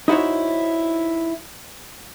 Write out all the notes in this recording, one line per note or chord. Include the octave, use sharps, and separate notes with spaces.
D#4 E4 F#4 C5 C#5